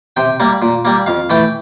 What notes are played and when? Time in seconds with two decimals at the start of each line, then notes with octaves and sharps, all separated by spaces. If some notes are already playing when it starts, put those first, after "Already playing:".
0.17 C3 G5
0.40 G3 A#3
0.62 A#2
0.85 G3 A#3
1.06 F2 F5
1.30 E3 A3 G5